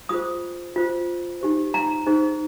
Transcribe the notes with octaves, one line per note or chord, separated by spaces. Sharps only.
F4 G#4 C5 D#6
F4 C5
D#4 G4 C5
A#5
D#4 G#4 C5